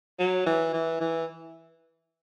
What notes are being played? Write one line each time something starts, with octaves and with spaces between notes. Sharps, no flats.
F#3
E3
E3
E3